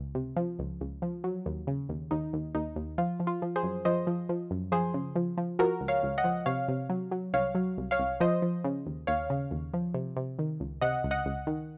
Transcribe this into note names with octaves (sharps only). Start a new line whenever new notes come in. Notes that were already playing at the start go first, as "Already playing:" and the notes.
Already playing: C#2
C3
F3
C#2
C#2
F3
F#3
D#2
C#3
D#2
D#2 D#4
D#2
D#2 D#4
D#2
F3 F4
F3
F4
F3
G#4 C5
F#2
F3 C5 D#5
F3
F3
F#2
F3 G#4 C5
C#3
F3
F3
F3 F#4 A#4
C#2
C#5 F5
C#2
D#5 F#5
F3
C3 C#5 F5
C3
F#3
F#3
C2 C#5 F5
F#3
C2
C#5 F5
C2
F3 C5 D#5
F3
C#3
D#2
D#2 C#5 F5
C#3
D#2
F3
C3
C3
D#3
C#2
C3 D#5 F#5
C#2
D#5 F#5
C#2
D#3